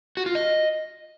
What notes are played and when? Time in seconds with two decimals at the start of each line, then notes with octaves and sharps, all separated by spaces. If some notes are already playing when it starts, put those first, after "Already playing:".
0.17 F#4
0.26 F4
0.35 D#5